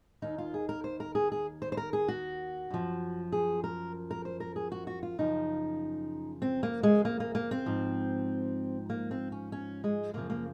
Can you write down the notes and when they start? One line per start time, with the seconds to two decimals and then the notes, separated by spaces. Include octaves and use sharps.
0.22 D#2 D#3 D#4
0.38 F4
0.54 G#4
0.69 A#4
0.84 C5
1.00 A#4
1.15 G#4
1.32 G#4
1.62 C5
1.72 C5
1.77 A#4
1.93 G#4
2.08 F#4
2.70 F#2 F3
3.32 G#4
3.64 A#4
4.11 A#4
4.25 C5
4.40 A#4
4.56 G#4
4.72 F#4
4.87 F#4
5.03 F4
5.18 F#2 C#3 F3 D#4
6.42 C4
6.63 A#3
6.83 G#3
7.05 A#3
7.20 A#3
7.35 A#3
7.51 C4
7.66 G#2 F3
8.90 A#3
9.11 C4
9.32 C#4
9.52 C#4
9.84 G#3
10.14 F#2 C#3 F3 A#3
10.30 A#3